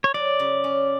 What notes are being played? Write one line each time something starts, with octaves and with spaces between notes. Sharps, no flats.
C#5
F#3 D5
C#3
C#4